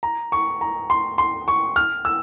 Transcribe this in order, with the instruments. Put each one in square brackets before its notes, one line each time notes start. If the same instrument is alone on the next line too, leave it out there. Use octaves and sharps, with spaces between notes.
[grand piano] A#5
C#6
A#5
C6
C6
C#6
F6
E6